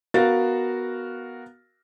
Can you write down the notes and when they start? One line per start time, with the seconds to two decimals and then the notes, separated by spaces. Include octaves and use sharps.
0.14 B3 F#4 A#4 F5 A6